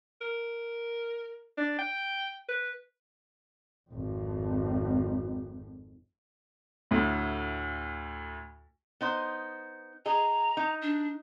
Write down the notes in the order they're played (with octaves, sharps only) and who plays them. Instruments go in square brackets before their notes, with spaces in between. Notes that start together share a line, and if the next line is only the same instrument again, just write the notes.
[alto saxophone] A#4
D4
G5
B4
[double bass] G#1 F2
[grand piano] D2 A2
[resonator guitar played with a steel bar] B3 D#4 C5
[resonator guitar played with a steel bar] G#4 D#5 [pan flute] A#5
[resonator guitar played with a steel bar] D#4
[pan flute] D4